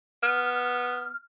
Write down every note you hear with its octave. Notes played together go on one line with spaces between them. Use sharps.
B3 F6